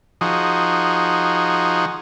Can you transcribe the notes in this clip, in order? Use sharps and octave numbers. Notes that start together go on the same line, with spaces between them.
F3 D#4 F#4 G#4